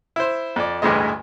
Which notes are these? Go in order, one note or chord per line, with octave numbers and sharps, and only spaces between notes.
E4 C5
F2 D5
A1 D2 G2 E3 G#3 D#5